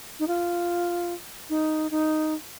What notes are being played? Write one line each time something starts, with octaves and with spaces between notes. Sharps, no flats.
D#4
F4
D#4
D#4